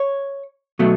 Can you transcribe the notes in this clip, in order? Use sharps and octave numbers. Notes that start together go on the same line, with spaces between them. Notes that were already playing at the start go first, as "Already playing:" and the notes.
Already playing: C#5
B2 F#3 A3